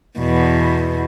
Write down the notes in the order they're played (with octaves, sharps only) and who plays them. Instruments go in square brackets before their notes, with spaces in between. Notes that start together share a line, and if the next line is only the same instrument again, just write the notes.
[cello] E2 B2